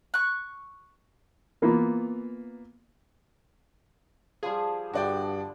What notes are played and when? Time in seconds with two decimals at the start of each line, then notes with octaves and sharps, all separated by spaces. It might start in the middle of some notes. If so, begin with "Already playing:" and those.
0.14 C#6 F#6
1.62 E3 A#3 B3 F4
4.43 F3 G3 G#4
4.94 G2 D3 F#4 D5 G5